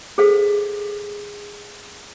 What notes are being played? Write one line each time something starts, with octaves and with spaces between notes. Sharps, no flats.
G#4 A4 C5 F5